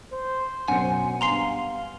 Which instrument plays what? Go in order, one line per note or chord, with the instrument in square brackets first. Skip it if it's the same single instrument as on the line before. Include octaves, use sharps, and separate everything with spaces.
[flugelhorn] C5
[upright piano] F#2 B2 C#7 [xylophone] F#5 [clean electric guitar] G#5
[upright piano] G2 B3 [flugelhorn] F5 [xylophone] A#5 C6 C7